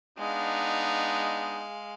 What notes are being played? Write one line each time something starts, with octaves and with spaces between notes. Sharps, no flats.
G#3 B3 D4 D#4 F5